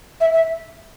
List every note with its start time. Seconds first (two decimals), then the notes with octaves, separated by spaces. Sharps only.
0.20 E5
0.33 E5